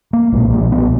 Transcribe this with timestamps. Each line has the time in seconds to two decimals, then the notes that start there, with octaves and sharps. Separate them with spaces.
0.13 A#3
0.32 B1 A#2 G#3
0.52 A#3
0.72 B3